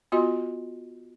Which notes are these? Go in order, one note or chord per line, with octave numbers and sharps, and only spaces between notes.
B3 F4 F#4 D#5 C6